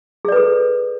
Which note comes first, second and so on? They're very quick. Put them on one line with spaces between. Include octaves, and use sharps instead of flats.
G#4 D5 B4 A4